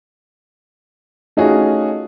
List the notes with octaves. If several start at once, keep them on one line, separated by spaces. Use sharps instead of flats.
A3 C#4 D#4 F4 F#4 G#4